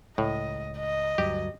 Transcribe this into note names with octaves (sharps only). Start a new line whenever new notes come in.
C#2 A2 D#5
D#5
D2 G2 F#3 G4